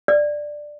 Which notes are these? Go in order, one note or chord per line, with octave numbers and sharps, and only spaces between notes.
D5